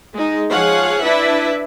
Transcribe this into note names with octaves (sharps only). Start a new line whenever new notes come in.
G#3 D#4
F3 G#4 C#5 F5 F#5
D4 E4 B4 E5